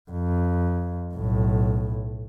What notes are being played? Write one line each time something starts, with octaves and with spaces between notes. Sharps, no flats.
F2
B1 A2